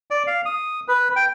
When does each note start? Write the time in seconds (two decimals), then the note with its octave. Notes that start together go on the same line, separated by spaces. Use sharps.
0.11 D5
0.27 F5
0.46 D#6
0.88 B4
1.16 G5